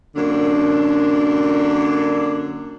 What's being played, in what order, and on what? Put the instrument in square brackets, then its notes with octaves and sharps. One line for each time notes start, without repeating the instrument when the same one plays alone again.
[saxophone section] F#2 D3 A#3 D4